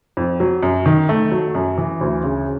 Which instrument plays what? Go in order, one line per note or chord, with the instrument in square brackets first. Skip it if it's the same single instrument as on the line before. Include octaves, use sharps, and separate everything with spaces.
[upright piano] F2
F#3
F#2
D#3
A3
F#3
F#2
E3
D2
C#3